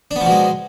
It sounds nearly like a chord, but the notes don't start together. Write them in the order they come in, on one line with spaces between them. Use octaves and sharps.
D4 B3 F3 B2 G#3